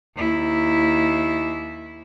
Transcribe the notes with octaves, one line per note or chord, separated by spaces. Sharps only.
D#2 E4